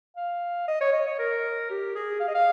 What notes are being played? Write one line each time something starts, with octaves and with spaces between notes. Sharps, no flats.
F5
D#5
C#5
D#5
C#5
A#4
G4
G#4
F5
D#5
F5